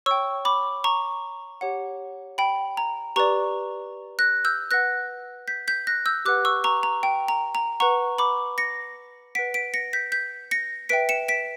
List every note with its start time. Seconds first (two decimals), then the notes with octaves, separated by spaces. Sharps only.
0.06 C#5 G5 C#6 E6
0.45 B5 D6
0.84 A#5 C#6
1.61 G4 C#5 F#5
2.38 G5 B5
2.77 A#5
3.16 G4 B4 D5 A#5 C#6
4.19 F#6 A#6
4.45 E6 G6
4.71 B4 F#5 F#6 A#6
5.48 G6 B6
5.68 G6 B6
5.87 F#6 A#6
6.06 E6 G6
6.25 G4 B4 F#5 D6 F#6
6.45 C#6 E6
6.64 A#5 C#6
6.83 A#5
7.03 G5
7.28 A#5
7.55 A#5
7.80 B4 F#5 A#5 C#6
8.18 B5 D6
8.58 A#6 C#7
9.35 B4 F#5 B6 D7
9.54 B6 D7
9.74 A#6 C#7
9.93 G6 B6
10.12 G6 B6
10.51 A#6 C#7
10.89 B4 E5 G5 B6 D7
11.09 C#7 E7
11.28 B6 D7